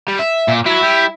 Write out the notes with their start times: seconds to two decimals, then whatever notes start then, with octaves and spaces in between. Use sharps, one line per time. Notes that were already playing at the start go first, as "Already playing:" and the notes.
0.08 G3
0.19 E5
0.48 A#2
0.66 F#3 E4
0.83 G3